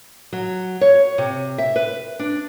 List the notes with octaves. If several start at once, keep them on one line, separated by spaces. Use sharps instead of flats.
F#3
C#5
C3
E5
B4
D4